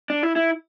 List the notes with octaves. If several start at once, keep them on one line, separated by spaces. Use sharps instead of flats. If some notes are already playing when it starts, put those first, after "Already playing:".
D4
E4
E4